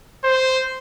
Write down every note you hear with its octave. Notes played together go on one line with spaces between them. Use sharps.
C5